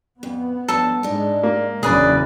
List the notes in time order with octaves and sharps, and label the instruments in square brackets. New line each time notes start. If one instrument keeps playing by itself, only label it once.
[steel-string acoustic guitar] F2 [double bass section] B3
[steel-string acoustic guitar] G2 F3 F#3 [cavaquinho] A4
[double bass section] G#2 G#3 [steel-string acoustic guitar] D4 D#4
[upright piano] A#3
[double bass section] F#1 E2 C#3 [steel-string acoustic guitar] C#4 D4 [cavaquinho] G#4 B4 D5